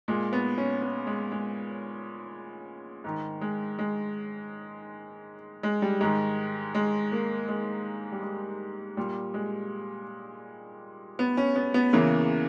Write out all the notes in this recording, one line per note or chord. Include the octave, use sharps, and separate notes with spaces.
A#2 G#3
B3
C#4
B3
G#3
G#3
G#2 D#3
G#3
G#3
G#3
G3
G#2 D#3 G#3
G#3
A#3
G#3
G3
G#3
A#2 G3
G#3
B3
C#4
B3
B3
E2 C#3 E3 A#3